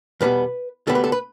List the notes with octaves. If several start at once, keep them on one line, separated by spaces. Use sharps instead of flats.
E2 B2 G3 B3 B4
D2 D3 G3 B3 A4
B4
A4
B4